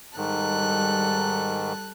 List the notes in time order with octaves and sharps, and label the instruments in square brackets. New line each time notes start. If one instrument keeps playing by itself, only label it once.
[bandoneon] G#2 D#3 [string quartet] G3 A4 F#6